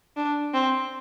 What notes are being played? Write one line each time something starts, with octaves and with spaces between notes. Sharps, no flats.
D4
C4